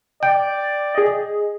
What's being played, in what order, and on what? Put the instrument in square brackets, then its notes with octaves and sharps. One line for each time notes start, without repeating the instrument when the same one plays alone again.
[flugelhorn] D5 [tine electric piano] G5
[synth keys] G#4 D#5